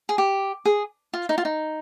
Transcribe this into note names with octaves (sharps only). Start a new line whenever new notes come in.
G#4
G4
G#4
F4
D#4
F4
D#4